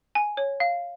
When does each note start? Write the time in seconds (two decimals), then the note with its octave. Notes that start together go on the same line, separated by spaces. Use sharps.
0.15 G#5
0.37 C#5
0.60 F5